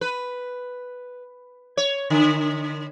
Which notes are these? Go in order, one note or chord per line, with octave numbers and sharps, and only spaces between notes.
B4
C#5
D3